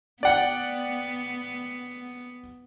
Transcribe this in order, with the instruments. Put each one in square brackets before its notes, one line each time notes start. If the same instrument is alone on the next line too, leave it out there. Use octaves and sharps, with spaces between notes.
[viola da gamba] B3 [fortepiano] D5 F#5 G5